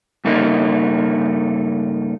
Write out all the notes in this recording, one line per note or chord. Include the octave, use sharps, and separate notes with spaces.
G2 C#3 A3 A#3 D#4